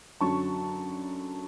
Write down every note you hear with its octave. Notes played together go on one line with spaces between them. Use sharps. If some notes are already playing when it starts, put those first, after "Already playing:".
F#2 D3 F#3 A5 C#6